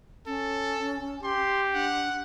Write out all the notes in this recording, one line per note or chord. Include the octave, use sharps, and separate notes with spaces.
C#4 A4
G4 C6
D4 F#5